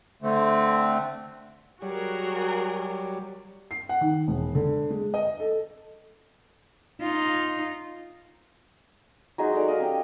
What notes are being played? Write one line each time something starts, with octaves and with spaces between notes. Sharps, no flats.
D3 A3 C4
F#3 G3 F#4 G#4 A#4
C7
F#5
D#3
E1
D3
G#3
D#5
A4
D#4 F4
F#3 G#3 D#4 F#4
F#4 A4 C#5 D5
D#5 F5
C#4 G4